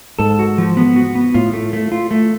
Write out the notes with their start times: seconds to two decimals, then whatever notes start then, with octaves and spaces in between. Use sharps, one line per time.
0.19 G#2 A4
0.39 F#4
0.58 F3
0.77 B3
0.96 F#4
1.15 B3
1.34 A2 F4
1.54 A3
1.73 A3
1.92 F4
2.11 A3